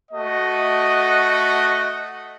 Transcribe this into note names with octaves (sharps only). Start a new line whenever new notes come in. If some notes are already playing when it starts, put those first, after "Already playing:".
A3 F#4 D#5